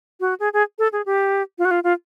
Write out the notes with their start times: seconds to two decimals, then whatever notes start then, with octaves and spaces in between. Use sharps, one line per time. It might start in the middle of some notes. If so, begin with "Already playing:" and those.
0.20 F#4
0.40 G#4
0.53 G#4
0.79 A4
0.93 G#4
1.06 G4
1.59 F4
1.65 F#4
1.71 F4
1.84 F4